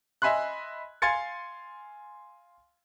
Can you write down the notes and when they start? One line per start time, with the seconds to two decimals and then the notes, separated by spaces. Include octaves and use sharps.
0.22 D#5 E5 G#5 B5 C6 F#6
1.02 F5 G#5 C6 G#6 A6 C#7